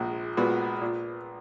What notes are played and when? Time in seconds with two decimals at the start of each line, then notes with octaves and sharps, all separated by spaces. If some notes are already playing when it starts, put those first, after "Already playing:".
Already playing: A#1 G#3
0.37 A#2 G#3 B3 F#4
0.82 A#2